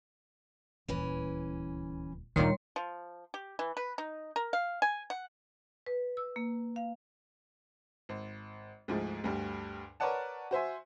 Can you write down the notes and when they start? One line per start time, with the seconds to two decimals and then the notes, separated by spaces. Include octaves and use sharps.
0.88 D#1 D2 E3 C#4
2.36 D2 G2 A#2 D#3 G3 C#5 C6
2.76 F3
3.34 G4
3.59 E3
3.77 B4
3.98 D#4
4.36 A#4
4.53 F5
4.82 G#5
5.10 F#5
5.86 B4
6.17 E6
6.36 A#3
6.76 F5
8.09 G#1
8.88 D2 G#2 F3
9.24 D2 G2 G3
10.00 A#4 B4 C#5 D5 F#5 A5
10.51 F#4 C5 E5 G#5